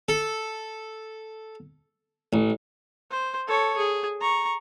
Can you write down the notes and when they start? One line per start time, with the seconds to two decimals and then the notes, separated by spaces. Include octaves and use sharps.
0.09 A4
2.33 A1
3.11 C5
3.47 A4 C#5
3.77 G#4
4.21 A#5 C#6